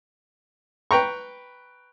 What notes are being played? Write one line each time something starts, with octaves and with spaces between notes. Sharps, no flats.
B4 G5 A#5 C#6